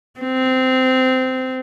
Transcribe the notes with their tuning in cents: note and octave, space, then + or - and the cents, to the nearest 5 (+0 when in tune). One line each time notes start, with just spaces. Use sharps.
C4 -15